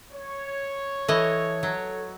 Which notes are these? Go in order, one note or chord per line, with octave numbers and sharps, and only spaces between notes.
C#5
E3 A4 D#5
F#3